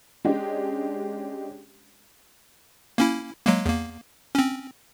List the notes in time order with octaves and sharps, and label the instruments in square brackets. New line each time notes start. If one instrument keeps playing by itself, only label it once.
[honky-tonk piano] G#3 C#4 D4 G4 G#4
[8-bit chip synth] A#3 C#4 E4
F#3 G#3 A#3
E2 A#3
C4 C#4